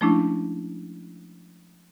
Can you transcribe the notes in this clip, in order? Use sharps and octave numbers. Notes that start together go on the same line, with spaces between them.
F3 G#3 A3 C#4 D4 E4